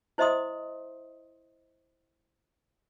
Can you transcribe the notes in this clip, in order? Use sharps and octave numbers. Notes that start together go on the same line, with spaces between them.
E4 C5 D#5 E5 C6 D#6